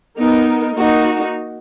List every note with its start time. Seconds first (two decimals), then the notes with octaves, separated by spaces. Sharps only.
0.17 B3 D#4 A#4
0.75 A#3 D#4 F#4